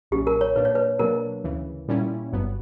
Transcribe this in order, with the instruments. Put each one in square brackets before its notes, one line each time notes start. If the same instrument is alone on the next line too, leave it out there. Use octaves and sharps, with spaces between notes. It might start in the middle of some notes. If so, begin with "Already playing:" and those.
[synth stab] B1 A#2 F#3 C#4 [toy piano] G4
[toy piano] A#4
C#5
[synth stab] A#2 A#3 D4 [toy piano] B4
[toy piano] C#5
B4
[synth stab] B2 F#3 A#3 D4 [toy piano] A#4
[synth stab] D2 C#3 E3
A#2 G3 C#4 E4
G1 G2 F#3 B3